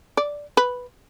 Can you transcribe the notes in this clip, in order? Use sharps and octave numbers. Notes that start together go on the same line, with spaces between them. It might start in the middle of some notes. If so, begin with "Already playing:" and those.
D5
B4